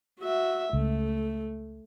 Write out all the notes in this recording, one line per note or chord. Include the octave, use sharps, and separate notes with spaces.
F#4 E5
C#2 A3